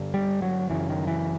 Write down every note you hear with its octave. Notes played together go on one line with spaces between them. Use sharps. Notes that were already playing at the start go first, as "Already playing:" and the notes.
Already playing: G2 D3
G3
F#3
F#2 C#3 E3
D#3
E3